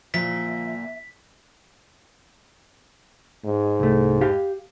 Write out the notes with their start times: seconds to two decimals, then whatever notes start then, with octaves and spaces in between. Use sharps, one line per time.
0.14 A#2 D3 F3 A#3 E5 B6
3.45 G#2
3.80 C2 A3
4.21 G4 F5